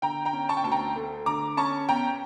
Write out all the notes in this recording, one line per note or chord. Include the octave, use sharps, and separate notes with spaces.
D3 G5 A#5
G5 A#5
C#4
A5 C#6
G5
D2 A5
G5 A#5
A3
D3 A#5 D6
C#4 A5 C#6
E2 G5 A#5